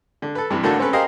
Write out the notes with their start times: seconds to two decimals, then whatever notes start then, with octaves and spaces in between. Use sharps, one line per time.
0.22 D3
0.35 A4 B4
0.50 G2 C3 E3
0.63 A2 D3 A#3 D4 F#4 A4
0.79 C4 C#4 A4 B4
0.93 G4 G#4 A#4 C5 D#5 F5